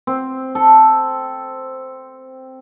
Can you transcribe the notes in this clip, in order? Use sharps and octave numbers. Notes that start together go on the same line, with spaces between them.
C4
A4